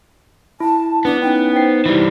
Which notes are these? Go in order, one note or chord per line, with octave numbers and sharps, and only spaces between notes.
E4 A5
B3 D4
C#4 D#4 E4 G5
D#4 C5 C7
E3 G3 E4